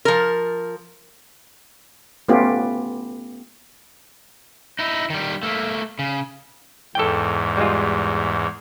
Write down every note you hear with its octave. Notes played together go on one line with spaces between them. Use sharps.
F3 A#4
A3 B3 C#4 F4 G4
D#4 E4
D#3 G3
A3 A#3
C#3
E2 G#2 A4 G5
G3 G#3 F4